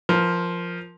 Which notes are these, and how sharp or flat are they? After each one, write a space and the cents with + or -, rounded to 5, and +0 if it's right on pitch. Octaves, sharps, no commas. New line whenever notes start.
F3 +0 A#4 +10